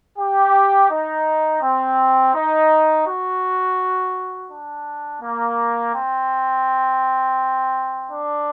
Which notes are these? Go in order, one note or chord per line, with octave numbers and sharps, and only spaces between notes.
G4
D#4
C4
D#4
F#4
D4
A#3
C4
D4